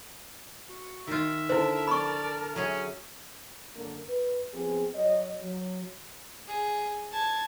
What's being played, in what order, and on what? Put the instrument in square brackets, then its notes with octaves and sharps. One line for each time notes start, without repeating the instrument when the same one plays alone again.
[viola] F#4
[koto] D#3 F4 [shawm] E5
[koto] D3 [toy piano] E4 C5 [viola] A#4 A5
[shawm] D5 [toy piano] B5 C#6
[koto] F#3 G#4 [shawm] C#4 [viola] F#4 E5
[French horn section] F#2 D3 A#3
B4
F3 B3 C4 G#4
F#3 C#5 D#5
F#3
[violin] G#4
A5 G#6